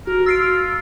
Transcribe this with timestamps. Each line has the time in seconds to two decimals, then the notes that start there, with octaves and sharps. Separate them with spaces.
0.07 F#4 A#4
0.26 F4 E6 C7 D7